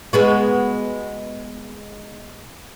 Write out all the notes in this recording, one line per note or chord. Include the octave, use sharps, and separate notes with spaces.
G#3 B3 F#4